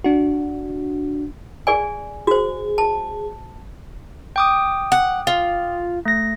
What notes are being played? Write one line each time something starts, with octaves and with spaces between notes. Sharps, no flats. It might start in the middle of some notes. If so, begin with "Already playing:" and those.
D4 F#4
G#4 D5 G#5
F#4 G#4 C5
A5
G5 D6 D#6
F#5
F4
A3 A#6